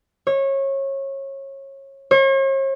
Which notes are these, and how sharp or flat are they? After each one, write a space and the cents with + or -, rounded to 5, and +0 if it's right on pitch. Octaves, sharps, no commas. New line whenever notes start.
C#5 -25
C#5 -45